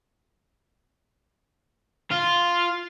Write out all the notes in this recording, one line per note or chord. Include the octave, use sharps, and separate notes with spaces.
F4